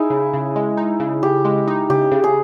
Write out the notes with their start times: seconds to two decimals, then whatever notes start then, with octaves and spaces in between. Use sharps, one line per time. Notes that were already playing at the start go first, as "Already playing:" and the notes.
Already playing: D#4 E4 G#4
0.10 C#3
0.34 C#3
0.56 G#3
0.77 D#4
1.00 C#3
1.23 C#3 G4
1.45 G#3
1.68 D#4
1.90 C#3 G4
2.11 C#3
2.24 G#4